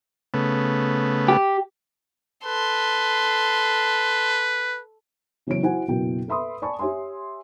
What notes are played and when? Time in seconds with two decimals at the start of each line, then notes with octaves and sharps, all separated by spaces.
0.34 C#3 A3 B3
1.28 G4
2.46 A4 B4 C6
5.47 C#3 E3 F#3 B3 C#5 D7
5.63 E4 F#4 C5 F#5 G#5
5.88 F#1 B2 E4 F#4 G5
6.28 A4 B4 E5 B5 C6 D#6
6.62 D5 G#5 A5 B5 C#6
6.79 G4 C#5 E5 G#5 C6